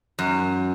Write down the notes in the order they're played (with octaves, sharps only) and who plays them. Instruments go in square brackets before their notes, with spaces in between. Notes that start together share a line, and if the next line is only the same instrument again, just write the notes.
[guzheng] F#2